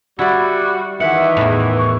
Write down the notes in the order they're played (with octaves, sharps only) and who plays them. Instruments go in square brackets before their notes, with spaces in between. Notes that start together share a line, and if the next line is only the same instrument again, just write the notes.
[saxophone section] G3 F#4 [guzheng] E4 D5
[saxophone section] D#3 E3 [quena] E5 [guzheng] F#5
[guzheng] E2 A2
[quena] C#6